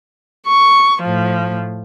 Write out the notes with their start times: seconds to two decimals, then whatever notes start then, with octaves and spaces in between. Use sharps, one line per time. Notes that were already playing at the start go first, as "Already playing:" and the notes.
0.48 C#6
1.03 A2 F3